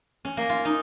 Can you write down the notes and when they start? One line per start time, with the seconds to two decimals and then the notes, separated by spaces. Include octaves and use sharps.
0.25 C#4
0.37 A#3
0.50 F4
0.65 D#4